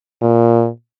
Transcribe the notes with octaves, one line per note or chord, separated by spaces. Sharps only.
A#2